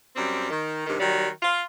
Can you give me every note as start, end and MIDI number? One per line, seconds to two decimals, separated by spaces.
0.16 0.49 42
0.16 0.49 55
0.16 0.49 60
0.50 0.86 51
0.87 0.96 43
0.87 0.96 48
0.87 0.96 51
1.00 1.27 51
1.00 1.27 54
1.00 1.27 55
1.43 1.62 65